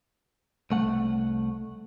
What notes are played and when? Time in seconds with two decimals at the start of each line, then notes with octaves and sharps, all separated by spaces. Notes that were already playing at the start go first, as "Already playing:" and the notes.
0.71 C2 A3 F#5